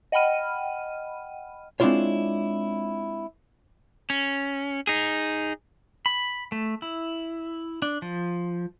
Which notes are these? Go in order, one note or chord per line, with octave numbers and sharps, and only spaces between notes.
D#5 F#5 G5 B5 F6 D#7
G#3 C4 D4 E4 F4 C#5
C#4
D#4 G#4
B5
A3
E4
D4
F3